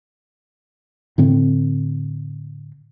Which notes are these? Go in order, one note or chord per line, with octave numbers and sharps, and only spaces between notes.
A2 D3 C4